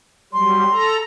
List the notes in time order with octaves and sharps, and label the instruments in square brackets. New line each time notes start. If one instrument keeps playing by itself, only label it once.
[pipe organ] F#3 G3 [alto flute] C6
[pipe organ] A4 A#5